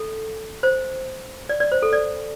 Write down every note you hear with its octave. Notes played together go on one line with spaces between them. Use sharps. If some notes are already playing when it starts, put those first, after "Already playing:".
Already playing: A4
C5
D5
D5
C5
A4
D5